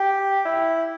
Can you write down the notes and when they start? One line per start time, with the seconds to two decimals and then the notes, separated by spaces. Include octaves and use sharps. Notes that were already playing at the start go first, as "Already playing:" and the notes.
Already playing: G4
0.45 E4